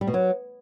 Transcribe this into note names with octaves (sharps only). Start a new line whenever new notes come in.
G3
B2
F#3